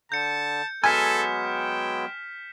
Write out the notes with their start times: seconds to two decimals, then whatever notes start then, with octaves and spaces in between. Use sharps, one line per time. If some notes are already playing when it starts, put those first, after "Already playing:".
0.12 D3 A5 G6 C#7
0.84 F#3 G#3 B3 A4 G#5 F6 B6 E7
1.45 G5